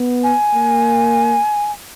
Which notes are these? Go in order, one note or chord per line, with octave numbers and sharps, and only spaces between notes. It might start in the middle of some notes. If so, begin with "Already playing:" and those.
Already playing: B3
G#5
A#3